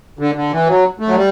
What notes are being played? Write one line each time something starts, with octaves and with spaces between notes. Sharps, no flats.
D3
D3
E3
F#3
A3
F#3
G3